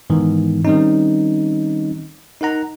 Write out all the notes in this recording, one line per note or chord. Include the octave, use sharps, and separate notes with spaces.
G#2 D#3 E3 B3
D#3 G3 C4 C#4 D#4
D#4 A#4 F#5 A#5